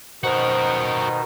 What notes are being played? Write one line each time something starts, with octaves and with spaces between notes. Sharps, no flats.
B2 D#3 D#4 F#4 A#4 C5